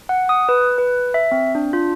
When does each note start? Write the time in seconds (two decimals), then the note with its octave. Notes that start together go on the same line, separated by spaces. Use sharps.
0.09 F#5
0.29 D#6
0.49 B4
0.78 B4
1.14 E5
1.32 C4
1.55 D4
1.73 F4